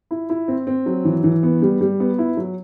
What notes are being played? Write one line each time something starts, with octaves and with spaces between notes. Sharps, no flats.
E4
E4
C4
C4
F#3
E3
E3
B3
G3
G3
B3
E4
F#3